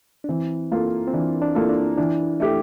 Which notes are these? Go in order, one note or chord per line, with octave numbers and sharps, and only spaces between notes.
D4
E3 C4
A#3 F4 A4
C4
E3 D4
D4
A#3 E4 F4 A4
D4
E3 D4
A3 E4 G4